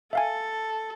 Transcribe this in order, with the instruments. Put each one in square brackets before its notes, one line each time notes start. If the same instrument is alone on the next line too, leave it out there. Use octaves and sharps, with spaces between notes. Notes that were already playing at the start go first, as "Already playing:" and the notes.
[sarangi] A4 [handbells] E5 F5 G#5